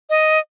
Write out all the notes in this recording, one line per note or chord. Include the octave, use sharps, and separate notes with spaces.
D#5